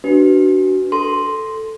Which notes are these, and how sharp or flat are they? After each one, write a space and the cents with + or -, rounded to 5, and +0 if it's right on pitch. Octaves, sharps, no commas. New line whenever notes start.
D4 +0 F#4 +25 B4 +0
A4 +0 C6 +0